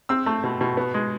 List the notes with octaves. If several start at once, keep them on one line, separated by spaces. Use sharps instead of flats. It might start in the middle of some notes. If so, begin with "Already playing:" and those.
C4 E6
A3
B2
B2
B3
G#3